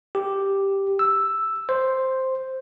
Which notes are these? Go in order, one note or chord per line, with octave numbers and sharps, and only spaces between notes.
G4
E6
C5